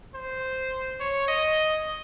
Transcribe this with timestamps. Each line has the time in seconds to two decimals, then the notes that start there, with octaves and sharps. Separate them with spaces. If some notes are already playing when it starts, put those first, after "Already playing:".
0.15 C5
1.00 C#5
1.28 D#5